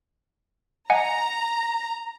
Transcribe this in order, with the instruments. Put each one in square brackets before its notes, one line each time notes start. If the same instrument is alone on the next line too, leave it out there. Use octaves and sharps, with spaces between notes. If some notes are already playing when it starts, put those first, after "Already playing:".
[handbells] D#5 F#5 G#5 [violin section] A#5